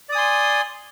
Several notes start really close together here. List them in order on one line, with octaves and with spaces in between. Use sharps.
D5 D#6 G#5 C6